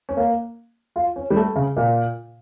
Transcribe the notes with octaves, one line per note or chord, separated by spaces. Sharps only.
C#4
A#3
F4
C#4
G3
A3
C#3
A#2